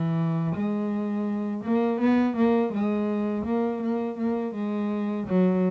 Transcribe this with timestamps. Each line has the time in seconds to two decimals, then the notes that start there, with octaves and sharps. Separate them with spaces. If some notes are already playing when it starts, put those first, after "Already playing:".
Already playing: E3
0.55 G#3
1.64 A#3
2.00 B3
2.36 A#3
2.73 G#3
3.45 A#3
3.82 A#3
4.18 A#3
4.54 G#3
5.27 F#3